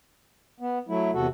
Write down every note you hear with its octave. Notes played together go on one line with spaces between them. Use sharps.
B3
F#3 A3 E4
E2 C3 F#4 A4